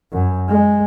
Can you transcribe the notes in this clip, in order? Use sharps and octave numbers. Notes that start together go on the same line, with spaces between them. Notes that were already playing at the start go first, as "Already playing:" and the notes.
F#2
G#3